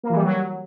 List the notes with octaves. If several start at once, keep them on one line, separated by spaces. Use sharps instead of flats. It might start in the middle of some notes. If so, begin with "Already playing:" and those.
A#3
E3
G3
F#3